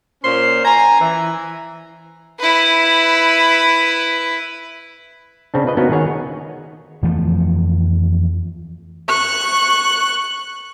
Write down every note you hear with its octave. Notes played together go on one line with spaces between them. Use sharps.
A#2 C#4 C5 C6
G#5 A#5
E3
E4 B4
C#3 C4 D4
F4 B4 D#5
A#3 B3 C#4 D#4 F#4 A#4
D#3 G#4 C#5 F#5
F2 E3 F3 A3
C#6 F#6